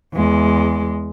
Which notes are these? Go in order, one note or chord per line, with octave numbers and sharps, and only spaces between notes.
E2 G#3